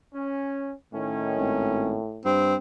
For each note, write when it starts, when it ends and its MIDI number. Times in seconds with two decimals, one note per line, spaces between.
0.14 0.73 61
0.94 2.26 45
0.94 2.01 51
0.94 2.01 61
1.38 1.98 32
2.25 2.56 43
2.25 2.55 60